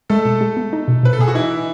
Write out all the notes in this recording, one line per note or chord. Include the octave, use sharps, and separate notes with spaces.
G#3 A3 A4
B2
G#3
B3
D#4
B2
B2 B4
A4
B2 G#4
F#4
E3 D#4 E4
D#4